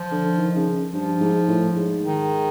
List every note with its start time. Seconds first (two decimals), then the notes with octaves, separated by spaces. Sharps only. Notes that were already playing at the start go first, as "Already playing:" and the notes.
Already playing: F3
0.11 D3
0.38 D#3
0.56 C#3
0.93 G2 F3
1.20 G#2
1.48 A2
1.76 G#2
2.02 D#3